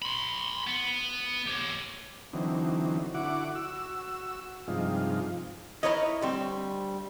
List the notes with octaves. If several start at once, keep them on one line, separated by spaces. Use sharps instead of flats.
B5 C6
B3
G4 C#5
D3 E3 F#3 C4 D#4
D3 E4 F#4 F#5 D6
F#4 E6
G2 C3 F3 G#3 D#4 F4
D#4 E4 A#4 B4 C#5 D#5
D2 G3 C4